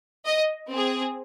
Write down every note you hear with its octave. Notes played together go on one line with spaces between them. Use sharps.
D#5
C4 G#4